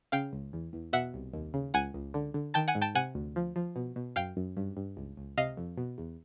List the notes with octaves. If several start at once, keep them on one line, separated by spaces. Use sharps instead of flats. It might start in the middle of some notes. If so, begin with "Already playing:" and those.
C#3 F5 G5
C#2
E2
E2
B2 E5 F#5
C2
D#2
C#3
C#2 F#5 G#5
C#2
D3
D3
D#3 G5 A5
F#5 G#5
G#2
G5 A5
C3 F#5 G#5
D2
F3
F3
B2
B2
F#2 F5 G5
F#2
G2
G2
C#2
C#2
C3 D#5 F5
F2
B2
E2